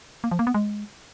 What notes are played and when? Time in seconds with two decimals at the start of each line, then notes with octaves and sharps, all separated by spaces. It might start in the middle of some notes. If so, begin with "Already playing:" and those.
0.24 A#3
0.31 F3
0.39 A#3
0.47 B3
0.54 G#3